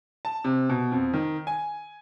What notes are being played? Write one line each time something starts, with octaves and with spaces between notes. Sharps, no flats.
A5
C3
B2
F2
D#3
G#5